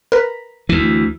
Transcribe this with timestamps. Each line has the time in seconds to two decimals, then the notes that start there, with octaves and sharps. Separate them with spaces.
0.12 A#4 B4
0.69 D2 E3